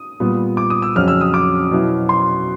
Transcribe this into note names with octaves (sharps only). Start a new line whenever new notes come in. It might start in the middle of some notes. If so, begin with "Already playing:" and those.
Already playing: D#6
A#2 G3 B3
D6
D#6
E6
F2 C#3 F#3 F6
E6
D#6
D6
B2 F#3 B3 E4
C6